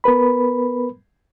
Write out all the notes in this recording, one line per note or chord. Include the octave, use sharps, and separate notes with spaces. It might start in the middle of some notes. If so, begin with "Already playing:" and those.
B3 A#4 B4 B5